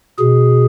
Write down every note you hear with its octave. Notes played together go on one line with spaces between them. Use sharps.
B2 G#4